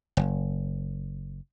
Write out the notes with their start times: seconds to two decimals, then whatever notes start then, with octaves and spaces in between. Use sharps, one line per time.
0.17 F#1